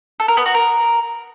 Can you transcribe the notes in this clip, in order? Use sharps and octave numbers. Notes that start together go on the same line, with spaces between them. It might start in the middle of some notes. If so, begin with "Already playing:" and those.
A4
A#4
B3
F#4
A#4